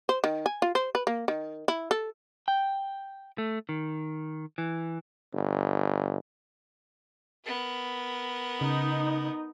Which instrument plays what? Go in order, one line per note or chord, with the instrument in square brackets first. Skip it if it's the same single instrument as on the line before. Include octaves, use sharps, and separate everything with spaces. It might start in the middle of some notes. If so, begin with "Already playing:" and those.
[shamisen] C5
D#3
G#5
F4
C5
B4
A#3
D#3
E4
A4
[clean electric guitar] G5
A3
D#3
E3
[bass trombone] G1
[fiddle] B3 A#4
[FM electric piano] C#3 [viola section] D#4